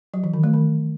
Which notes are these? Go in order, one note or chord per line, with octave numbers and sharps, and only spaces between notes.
F#3
E3
D#3
A3
D#3